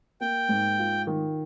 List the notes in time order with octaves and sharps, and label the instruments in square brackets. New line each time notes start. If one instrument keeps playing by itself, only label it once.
[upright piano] A#3 [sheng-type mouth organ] G5
[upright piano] G#2
F4
D#3